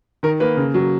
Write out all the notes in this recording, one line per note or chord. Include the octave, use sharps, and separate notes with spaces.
D#3 A#4
A#3 B4
C#3
F#3